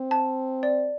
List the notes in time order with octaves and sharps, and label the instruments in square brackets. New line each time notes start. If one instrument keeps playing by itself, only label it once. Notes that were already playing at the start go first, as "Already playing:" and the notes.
Already playing: [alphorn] C4
[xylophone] A5
D5